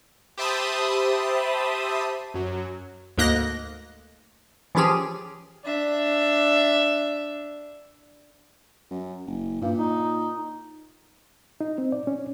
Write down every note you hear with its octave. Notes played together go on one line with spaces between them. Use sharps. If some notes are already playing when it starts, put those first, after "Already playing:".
G4 C5 E5 A5 B5 D#6
F#2 F#3
D2 G#2 A#3 D#5 F#6 A#6
E3 F3 C#4 G4 G#4
D4 E5
F#2
F#1
G2 A#2
D#4
D#4
C4
D5
C#4